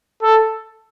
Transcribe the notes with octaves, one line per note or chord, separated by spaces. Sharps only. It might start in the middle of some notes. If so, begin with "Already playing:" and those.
A4